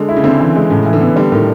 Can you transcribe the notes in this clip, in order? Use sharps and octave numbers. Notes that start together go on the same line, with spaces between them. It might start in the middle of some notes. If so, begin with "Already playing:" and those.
Already playing: D3 G#3
E4
C#3
D3 C4
E3
G#3
A2 C#3
E3
D3
B3
D3 G3
A2 D#3